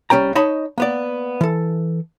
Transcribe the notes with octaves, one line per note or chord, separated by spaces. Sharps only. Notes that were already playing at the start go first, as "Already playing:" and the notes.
C2 G3 C#4 G5 A#5
D#4 C#5 D#5 A5 B5
A#3 B3 D5
E3 A4